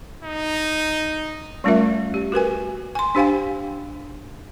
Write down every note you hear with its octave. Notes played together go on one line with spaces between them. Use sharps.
D#4
G3 A3 C#4 F4 A#4 E5
G4
F#4 A#4 B4 G#5
G#5 C6
D4 G4 C5 F5 G5 G#5